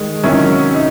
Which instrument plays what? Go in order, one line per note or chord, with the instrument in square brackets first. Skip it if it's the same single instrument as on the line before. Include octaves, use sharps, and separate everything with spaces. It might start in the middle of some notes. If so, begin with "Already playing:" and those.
Already playing: [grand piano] D#3 G#3 D#4
C3 D#3 F#3 C#4 E4
D#4